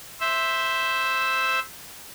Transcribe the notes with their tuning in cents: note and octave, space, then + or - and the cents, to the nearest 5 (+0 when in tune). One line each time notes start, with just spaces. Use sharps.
C5 +0 E5 +0